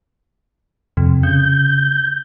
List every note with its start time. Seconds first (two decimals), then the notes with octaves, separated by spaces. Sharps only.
0.97 F2 C3
1.23 C#3 G6